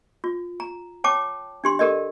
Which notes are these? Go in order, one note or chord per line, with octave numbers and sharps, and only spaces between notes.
F4
A#5
C#5 G5 A5 D6
D4 G4 C6
G4 A4 A#4 D5 D#5